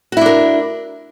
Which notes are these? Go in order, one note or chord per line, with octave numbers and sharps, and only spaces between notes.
D4 E4 F#4 A#4